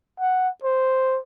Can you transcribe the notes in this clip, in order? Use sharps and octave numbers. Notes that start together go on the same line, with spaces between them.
F#5
C5